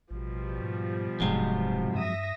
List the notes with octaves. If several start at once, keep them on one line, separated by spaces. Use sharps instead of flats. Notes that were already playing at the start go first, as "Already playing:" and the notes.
A1 B2 F3 G3
G#2
D1 F2 G#2 C3 F#3 G#3
G2 E5 D#6 A#6